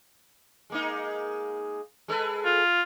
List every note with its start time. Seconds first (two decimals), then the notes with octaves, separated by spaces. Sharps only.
0.70 G#3 A#3 D#4
2.08 G#3 A4 B4
2.45 F4